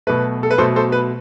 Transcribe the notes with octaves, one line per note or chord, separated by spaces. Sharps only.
B2 F#3 A3 B4
A4
B4
B2 F#3 A3 A4 C5
A4 C5
B4